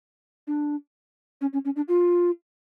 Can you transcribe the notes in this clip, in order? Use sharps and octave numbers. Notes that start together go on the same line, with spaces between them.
D4
C#4
C#4
C#4
D4
F4